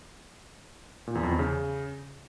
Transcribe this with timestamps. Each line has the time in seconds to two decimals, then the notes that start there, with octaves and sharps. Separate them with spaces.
1.07 A#2
1.15 E2
1.23 F2
1.31 E2
1.39 C#3